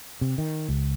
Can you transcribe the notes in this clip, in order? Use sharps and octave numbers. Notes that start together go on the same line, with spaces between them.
C3
D#3
C#2